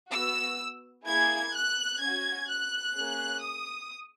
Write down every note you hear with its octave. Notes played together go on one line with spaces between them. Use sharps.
B3 F#4 E6
A#3 E4 G#4 G#6
F#6
C#4 F#4 G#6
F#6
A#3 C#4 G#4
D#6